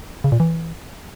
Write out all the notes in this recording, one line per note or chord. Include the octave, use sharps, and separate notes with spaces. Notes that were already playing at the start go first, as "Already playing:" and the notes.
C#3
A#2
E3